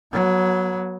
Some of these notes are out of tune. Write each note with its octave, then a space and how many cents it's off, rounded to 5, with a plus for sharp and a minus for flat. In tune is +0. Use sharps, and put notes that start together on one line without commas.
F#3 +0 B3 -35